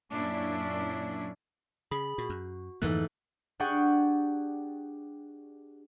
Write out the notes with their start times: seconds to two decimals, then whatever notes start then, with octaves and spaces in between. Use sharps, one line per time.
0.13 F#2 A#2 C#4 D4 E4
1.91 C#3 G#4 B5
2.18 A#2 F#4
2.30 F#2
2.82 F2 G#2 D3 E3 A3 A#3 F#6
3.60 D4 G4 G#4 F#5 G5 C#6